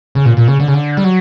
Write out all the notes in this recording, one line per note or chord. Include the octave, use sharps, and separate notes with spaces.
C#3
A#2
A#2
C#3
D3
C#3
D3
G3
F#3